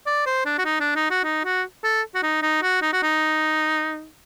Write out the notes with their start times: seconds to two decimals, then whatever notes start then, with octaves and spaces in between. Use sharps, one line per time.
0.07 D5
0.26 C5
0.46 D4
0.58 F#4
0.65 D#4
0.80 D4
0.95 D#4
1.11 F#4
1.24 D#4
1.45 F#4
1.84 A4
2.15 F#4
2.23 D#4
2.42 D#4
2.62 F#4
2.82 D#4
2.93 F#4
3.03 D#4